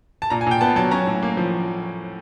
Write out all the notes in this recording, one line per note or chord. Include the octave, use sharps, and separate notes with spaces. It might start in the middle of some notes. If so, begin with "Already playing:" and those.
A5
A#2 A#5
G#5
A#2 G5
B3 A5
F#3 A5
C#4 A#5
A2
A#3
F3